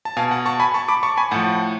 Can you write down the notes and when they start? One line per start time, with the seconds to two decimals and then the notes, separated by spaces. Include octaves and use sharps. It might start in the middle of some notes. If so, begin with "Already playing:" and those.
0.05 A5
0.17 B2 F5 G#5
0.31 F#5 A5
0.46 A5 C#6
0.60 G#5 B5
0.74 A5 C#6
0.88 B5 D6
1.03 A5 C#6
1.17 G#5 B5
1.31 A2 F3 F#5 A5